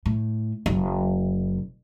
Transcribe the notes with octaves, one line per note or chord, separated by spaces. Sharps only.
A2
F#1